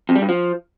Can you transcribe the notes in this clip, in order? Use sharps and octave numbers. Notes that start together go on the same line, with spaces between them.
F2
G3
G2
F3